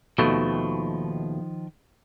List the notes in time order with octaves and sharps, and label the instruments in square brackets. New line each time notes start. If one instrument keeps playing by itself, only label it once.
[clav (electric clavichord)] D#2 B2 A3 [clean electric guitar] D#3 F3